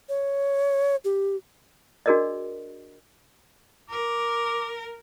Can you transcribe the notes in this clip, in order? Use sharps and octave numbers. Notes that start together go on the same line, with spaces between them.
C#5
G4
D4 F#4 G#4 A#4 D5 D#5
A#4 D6